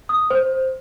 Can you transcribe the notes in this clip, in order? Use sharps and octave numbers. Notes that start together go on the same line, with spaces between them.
D#6
C5